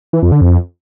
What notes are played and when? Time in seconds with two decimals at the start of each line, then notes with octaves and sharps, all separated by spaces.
0.13 E3
0.22 F2
0.32 D3
0.41 F2